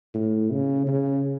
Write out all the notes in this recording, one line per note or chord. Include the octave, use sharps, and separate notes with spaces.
A2
C#3
C#3